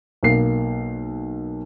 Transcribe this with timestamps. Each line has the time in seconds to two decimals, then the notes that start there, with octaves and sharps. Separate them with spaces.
0.23 B1 A#3 C7